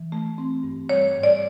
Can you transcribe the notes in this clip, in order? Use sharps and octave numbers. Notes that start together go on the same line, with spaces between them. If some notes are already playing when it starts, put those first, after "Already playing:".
Already playing: E3
A3
C4
G2
G3 C#5
G#2
D5